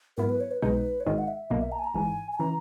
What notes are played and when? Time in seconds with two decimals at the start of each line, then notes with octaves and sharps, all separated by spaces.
0.17 G#2 F#3 B3 E4 A#4
0.29 B4
0.40 C#5
0.51 B4
0.62 B1 B2 G#3 D#4 B4
1.00 C#5
1.06 G#1 G#2 D#3 D#5
1.18 F#5
1.28 E5
1.50 B1 B2 A#3 D#5
1.61 E5
1.72 A#5
1.79 G#5
1.84 A#5
1.94 G#1 G#2 E3 G#5
2.32 G#5
2.38 C#3 E3 A#5